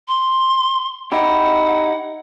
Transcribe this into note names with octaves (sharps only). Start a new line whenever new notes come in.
C6
D#4 E4 G4 F#5